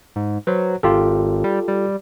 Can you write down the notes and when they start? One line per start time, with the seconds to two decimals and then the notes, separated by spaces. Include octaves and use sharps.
0.16 G#2
0.47 F#3 B4 C5
0.83 G#1 F4 G4 A4
1.44 G3
1.68 G3